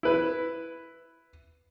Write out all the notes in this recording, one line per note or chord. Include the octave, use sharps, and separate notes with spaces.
E4 B4